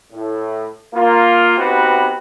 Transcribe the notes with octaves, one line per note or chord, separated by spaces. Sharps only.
A2
A#3 F4
B3 C4 D#4 F#4 G4 B4